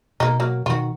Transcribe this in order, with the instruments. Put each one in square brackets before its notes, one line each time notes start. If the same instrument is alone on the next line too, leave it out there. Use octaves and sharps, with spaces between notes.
[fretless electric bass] B2 [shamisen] A#3 D#4
[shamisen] F#3 A#3
[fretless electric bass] B2 D#3 [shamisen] F4 F#4